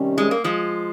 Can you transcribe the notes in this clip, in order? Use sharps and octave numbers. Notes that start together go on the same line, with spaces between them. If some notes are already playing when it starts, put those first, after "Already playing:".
Already playing: C3 D#3 G3 C#4
G#3
A#3
F3 G#3